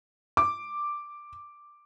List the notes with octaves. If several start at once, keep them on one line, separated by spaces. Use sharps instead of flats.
D6